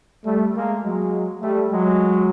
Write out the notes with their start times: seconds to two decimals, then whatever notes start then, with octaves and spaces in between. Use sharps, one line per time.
0.25 G3 A3
0.54 G#3 A#3
0.83 F#3 G#3
1.42 G3 A3
1.71 F#3 G#3